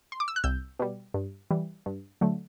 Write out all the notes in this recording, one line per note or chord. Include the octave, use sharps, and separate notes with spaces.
C6
D6
E6
F#6
C2 E6 G6
B2 G3
G2
E3 G3
G2
D3 F#3 A3